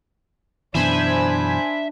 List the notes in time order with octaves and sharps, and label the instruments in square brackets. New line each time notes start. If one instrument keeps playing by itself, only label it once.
[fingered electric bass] F#2 B2 E3 [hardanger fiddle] D4 [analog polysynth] C5 G#5 B5 [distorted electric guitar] E5